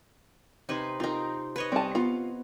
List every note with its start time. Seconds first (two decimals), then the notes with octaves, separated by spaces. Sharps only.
0.69 C3 D#4 B4 C5 G#5
1.00 C4 D#4 F4 A#4
1.56 B4 C#5 D#5
1.72 G3 C4 A5
1.95 B3 F4